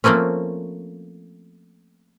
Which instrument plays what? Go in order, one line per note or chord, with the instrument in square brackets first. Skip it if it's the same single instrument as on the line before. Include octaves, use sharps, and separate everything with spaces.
[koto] F3 A3 A#3 C4 C#4